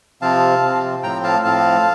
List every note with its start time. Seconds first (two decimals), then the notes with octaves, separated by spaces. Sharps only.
0.22 C3 F3 C4 F5 A5
0.63 C3 F3 C4
1.03 A2 F3 C4 G5 A#5
1.24 F5 A5
1.44 A2 F3 C4 F5 A5